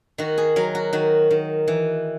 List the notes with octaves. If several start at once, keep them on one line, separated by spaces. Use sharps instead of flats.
D#3 F#4
G#4
F#3 A#4
F#4
D#3 F#4
D#3
E3